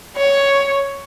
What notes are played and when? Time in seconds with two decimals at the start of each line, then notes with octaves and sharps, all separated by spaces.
0.16 C#5